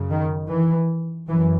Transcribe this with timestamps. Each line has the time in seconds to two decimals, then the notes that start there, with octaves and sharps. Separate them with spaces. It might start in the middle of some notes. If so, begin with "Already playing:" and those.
Already playing: F#2 C#3
0.10 D#3
0.49 E3
1.28 F#2 E3